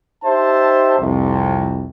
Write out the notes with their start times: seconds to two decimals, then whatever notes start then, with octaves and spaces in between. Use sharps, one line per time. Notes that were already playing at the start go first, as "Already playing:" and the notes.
0.24 D#4 G4 C5 E5 A5
0.99 C2 F2